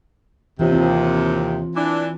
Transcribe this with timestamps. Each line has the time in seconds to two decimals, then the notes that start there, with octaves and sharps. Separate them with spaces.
0.60 D#2 C3 E3 F4 C#5
0.72 C4 F4
1.76 E3 D4